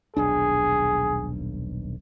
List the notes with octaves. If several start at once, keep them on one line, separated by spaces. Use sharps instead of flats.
D#1 B1 D4 G#4